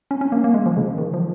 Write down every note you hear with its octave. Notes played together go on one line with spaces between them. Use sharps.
C#4
C#4
A#3
A#3
G#3
F3
C#3
D#3
F3